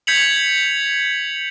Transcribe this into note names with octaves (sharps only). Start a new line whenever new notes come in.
G6 G#6 B6 C#7 F7 F#7